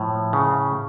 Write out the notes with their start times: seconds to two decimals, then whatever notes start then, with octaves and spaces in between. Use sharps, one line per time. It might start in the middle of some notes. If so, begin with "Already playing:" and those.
Already playing: A2 F3
0.33 C#3